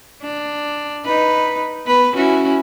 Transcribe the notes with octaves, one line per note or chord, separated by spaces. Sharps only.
D4
D#4 B4
B3 B4
C#4 E4 F#4